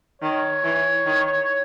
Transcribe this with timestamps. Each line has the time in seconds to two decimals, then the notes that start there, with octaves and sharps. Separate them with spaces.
0.22 D#3 C#5
0.64 E3
1.06 D#3